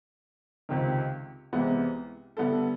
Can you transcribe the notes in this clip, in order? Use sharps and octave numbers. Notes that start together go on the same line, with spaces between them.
C#2 C3 D#3
C2 C3 E3 G#3 B3
D3 G3 B3 E4 A4